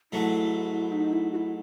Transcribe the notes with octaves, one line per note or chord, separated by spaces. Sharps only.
G#2 F#3 A3 E4
D#4
E4
F#4
E4